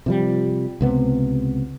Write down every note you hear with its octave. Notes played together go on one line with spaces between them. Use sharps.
C3 F3 G3
C#2 C3 B3